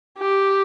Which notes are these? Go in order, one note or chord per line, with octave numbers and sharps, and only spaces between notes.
G4